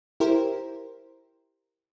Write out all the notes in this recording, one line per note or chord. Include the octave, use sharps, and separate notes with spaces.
E4 G4 A#4 C5